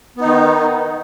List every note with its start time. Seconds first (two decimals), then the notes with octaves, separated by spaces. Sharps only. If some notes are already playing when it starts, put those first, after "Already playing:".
0.17 B3
0.21 D#4
0.25 D#3